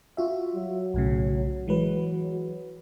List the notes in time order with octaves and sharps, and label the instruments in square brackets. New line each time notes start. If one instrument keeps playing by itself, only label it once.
[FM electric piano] F4 F#4 E5
[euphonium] F#3
[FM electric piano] B1 A2 C#3
[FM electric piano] E3 G#3 B4 [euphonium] F#3